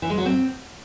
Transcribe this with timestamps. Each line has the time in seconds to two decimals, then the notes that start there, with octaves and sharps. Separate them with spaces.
0.02 E3
0.10 G#3
0.18 F#3
0.25 C4